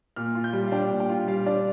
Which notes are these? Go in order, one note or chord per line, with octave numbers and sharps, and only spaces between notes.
A#2 F6
F4
G6
G3
F5
D4 G5
A#2
G5
F4
G3 F5
D4 D5